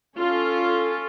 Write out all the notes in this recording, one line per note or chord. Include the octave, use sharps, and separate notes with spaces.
C#4 F4 A4